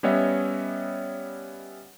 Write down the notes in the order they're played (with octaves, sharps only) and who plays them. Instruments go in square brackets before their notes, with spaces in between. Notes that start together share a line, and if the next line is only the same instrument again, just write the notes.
[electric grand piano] G3 B3 C#4 C#5 D#5 E5